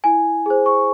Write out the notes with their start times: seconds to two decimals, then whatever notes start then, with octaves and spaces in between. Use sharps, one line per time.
0.04 E4 G#5
0.46 G#4 C5
0.66 C#6